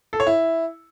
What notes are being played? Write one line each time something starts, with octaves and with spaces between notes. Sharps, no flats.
A4
C#5
E4